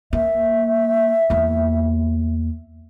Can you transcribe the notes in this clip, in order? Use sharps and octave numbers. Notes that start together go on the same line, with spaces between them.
A#3 E5
E2 A#3